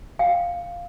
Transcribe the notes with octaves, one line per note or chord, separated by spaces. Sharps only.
F5 G5